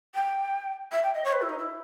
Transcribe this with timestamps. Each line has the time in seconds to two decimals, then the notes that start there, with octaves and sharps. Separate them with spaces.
0.14 G5
0.91 E5
1.02 G5
1.14 D#5
1.24 C#5
1.32 B4
1.41 E4
1.49 D#4
1.58 E4